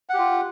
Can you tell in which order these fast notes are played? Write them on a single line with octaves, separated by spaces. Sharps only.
F#5 G4 F4